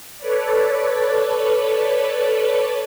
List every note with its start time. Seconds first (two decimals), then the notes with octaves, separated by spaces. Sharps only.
0.18 A4 B4 C#5 D5